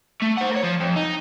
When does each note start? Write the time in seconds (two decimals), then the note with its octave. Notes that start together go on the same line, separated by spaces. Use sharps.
0.22 A3
0.37 C5 F#5
0.51 A#4 C#5
0.63 F3
0.80 F2
0.96 D#4